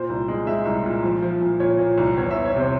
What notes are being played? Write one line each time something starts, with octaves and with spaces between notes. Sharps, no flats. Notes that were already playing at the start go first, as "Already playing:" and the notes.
Already playing: A#2 C5
C2
G#3
G#3 E5
C2
A#2
F3
F3
A#2
A#2 C#5
A#2
C2
E2 C#5
E5
E2
C#5
C3 C5